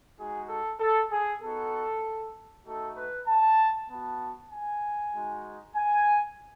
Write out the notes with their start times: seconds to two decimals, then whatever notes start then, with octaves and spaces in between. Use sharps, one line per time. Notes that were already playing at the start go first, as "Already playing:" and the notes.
0.18 G#3 D#4 F#4 G#4
0.49 A4
0.80 A4
1.11 G#4
1.41 B3 D#4 F#4 A4
2.65 A3 D#4 F#4 A4
2.97 B4
3.28 A5
3.90 B3 F#4 A5
4.51 G#5
5.14 G#3 D#4 F#4
5.76 G#5